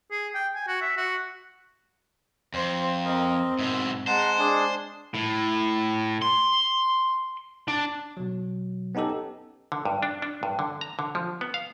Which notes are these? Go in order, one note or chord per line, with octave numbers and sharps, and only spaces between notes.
G#4
G5
G#5
F#4
E5
F#4
F2 C5
C4 A#4 D#5
G#2 B2 E5
G#3 C5 F#5 A5 A#5
D4 G#4
A2
C6
D4
B2 F#3
B3 C#4 D#4 G4 A4
D3
G2
D4
D4
G2
D3
A#5
D3
F3
B3
F5